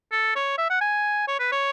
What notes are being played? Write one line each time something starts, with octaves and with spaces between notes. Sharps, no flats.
A4
C#5
E5
F#5
G#5
C#5
B4
C#5